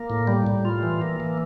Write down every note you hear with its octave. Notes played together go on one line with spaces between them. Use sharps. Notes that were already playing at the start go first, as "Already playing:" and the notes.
Already playing: A#3
A2
G3
A2
F4
E3
A#3
E3